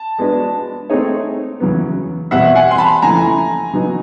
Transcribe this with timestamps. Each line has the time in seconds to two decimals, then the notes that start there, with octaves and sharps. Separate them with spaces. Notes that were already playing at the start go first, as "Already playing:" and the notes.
Already playing: A5
0.18 G#3 B3 D4 F#4 B4
0.90 A3 C4 D#4 G#4 C#5
1.60 E2 C#3 F#3 B3
2.31 E2 B2 G3 C4 E5 F#5
2.55 F#5 G#5
2.71 C6
2.78 A5 B5
3.02 F2 C#3 E3 A3 G#5 A#5
3.73 C#3 F#3 B3 D#4 F#4